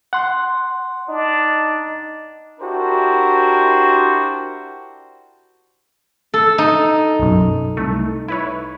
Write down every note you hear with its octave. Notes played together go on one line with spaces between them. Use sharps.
F#5 C6
D4 D#4
D4 E4 F#4 G4 A#4 C5
A4
D#4
B1 F#2
C2 A3
E4 B4 C#5